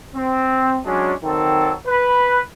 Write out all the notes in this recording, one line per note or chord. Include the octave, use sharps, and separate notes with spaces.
C4
F#3 G#3 C#4 D4
D#3 F#3 C4 A4
B4